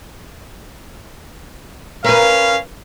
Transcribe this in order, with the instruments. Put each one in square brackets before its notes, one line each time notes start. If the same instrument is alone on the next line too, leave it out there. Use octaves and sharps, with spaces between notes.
[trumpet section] C#4 F5 [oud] A#4 B4